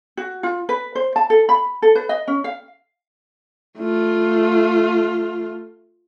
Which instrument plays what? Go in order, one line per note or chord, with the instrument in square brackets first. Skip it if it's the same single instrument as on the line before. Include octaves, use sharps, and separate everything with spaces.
[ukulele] F#4
F4
B4
C5
A5
A4
B5
A4
B4
D#5
C#4
F5
[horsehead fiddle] A3 F4